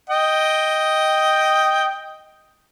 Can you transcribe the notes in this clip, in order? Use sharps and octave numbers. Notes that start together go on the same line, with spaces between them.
D#5 G5